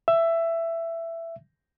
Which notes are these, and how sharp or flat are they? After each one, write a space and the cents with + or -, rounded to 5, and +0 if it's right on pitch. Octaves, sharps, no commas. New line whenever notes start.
E5 +15